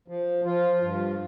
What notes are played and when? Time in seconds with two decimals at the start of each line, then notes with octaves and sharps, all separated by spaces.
0.08 F3
0.45 F3 F4
0.82 G2